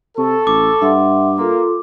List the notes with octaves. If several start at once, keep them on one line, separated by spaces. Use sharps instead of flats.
C3 A4 C#6
A1 D6
G2 E5 F#5 C6
A#3 F4 A4 C6